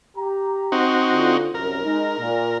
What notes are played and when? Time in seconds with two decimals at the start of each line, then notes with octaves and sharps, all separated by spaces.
0.17 G4 A#5
0.72 C4 D#4 F#4
1.13 D3 F4
1.54 C2 F#2 A#4
1.84 G#3 D#4
2.20 A#2